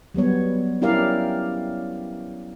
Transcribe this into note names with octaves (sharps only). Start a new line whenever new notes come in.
F#3 G3 B3 C#5
C#4 E4 G4 A#4 D5 F5